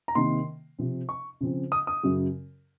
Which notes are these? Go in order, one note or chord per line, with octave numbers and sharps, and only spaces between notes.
A#5
C3 D#3 A#3 C6
C3 F3 C4
C#6
C#3 F3 C4
D#6
D#6
F#2 C#3 F#3